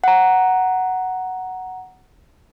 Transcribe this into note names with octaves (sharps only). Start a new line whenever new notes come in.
F#5 A#5